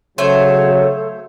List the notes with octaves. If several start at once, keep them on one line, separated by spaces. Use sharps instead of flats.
C#3 F#3 A3 A4 C5 C#5